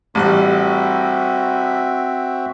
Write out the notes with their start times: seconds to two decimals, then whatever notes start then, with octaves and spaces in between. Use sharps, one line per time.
0.15 A1 G3 C4 F#4 E5 F#6